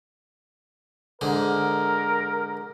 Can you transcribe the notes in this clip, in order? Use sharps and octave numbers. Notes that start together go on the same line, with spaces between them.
G#2 D3 A#4